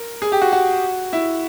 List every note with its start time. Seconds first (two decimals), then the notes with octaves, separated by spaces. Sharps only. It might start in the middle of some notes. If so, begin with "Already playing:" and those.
Already playing: A#4
0.22 G#4
0.32 G4
0.42 F#4
0.52 F#4
1.13 E4